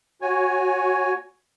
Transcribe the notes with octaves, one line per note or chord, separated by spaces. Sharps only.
F#4 C#5 G#5